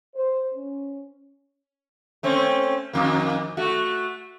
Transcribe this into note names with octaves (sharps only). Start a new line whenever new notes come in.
C5
C#4
A3 C4 C#4
F2 D#3 A#3
A3 F#4